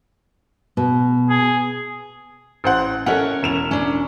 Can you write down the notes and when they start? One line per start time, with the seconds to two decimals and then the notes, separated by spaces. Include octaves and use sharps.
0.77 B2
1.30 G#4
2.64 A1 C5 F#5
3.06 C#4 A4 A#4 C#5 E5 F#5
3.43 E1 E7 F7
3.71 C#4 D4